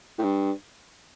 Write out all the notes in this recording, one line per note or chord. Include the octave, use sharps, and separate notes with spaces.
A2
G2